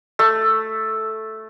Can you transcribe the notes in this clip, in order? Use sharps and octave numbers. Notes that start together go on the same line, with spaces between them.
A3